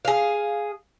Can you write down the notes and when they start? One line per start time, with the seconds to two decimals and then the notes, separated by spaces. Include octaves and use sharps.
0.05 G#4 F5